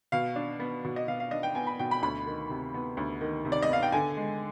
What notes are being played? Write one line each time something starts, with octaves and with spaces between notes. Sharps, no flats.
B2 F5
D4
B3
B2
D#5
B2 F5
F5
D4 D#5
G5
B3 G#5
B5
B2 G5
B5
D2 B5
D#3
C3
B3
D2
D#3
C3
D5
D#5
B3 F5
G5
D3 G#5
G#3